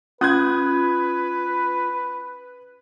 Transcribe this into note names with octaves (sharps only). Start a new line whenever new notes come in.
C#4 F4 B4 D#6 F#6 G#6